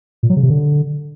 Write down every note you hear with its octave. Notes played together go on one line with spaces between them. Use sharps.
A#2
F#3
C#3
C3
D3